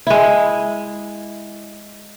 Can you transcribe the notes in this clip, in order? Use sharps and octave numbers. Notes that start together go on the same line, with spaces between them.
G#3 E4